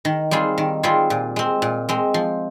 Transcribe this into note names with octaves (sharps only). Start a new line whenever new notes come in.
D#3
G3 C4 F4 G#4
D#3
G3 C4 F4 G#4
A#2
G#3 C4
A#2
G#3 C4
F3